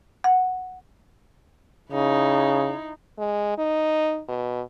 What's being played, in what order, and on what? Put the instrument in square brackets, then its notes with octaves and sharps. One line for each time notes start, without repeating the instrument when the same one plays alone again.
[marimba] F#5
[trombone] C#3 [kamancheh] D#4 E4
[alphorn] G#3
D#4
B2